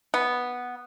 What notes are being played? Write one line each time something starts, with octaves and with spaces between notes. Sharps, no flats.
B3